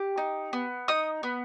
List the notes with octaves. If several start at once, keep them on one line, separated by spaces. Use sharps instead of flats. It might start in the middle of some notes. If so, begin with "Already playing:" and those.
Already playing: G4
D#4
B3
D#4 D#6
B3